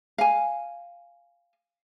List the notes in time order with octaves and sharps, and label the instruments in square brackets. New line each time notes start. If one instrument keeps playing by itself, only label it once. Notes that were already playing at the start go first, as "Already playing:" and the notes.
[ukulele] F5 G#5